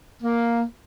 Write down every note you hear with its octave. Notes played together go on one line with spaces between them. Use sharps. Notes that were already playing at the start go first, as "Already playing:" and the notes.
A#3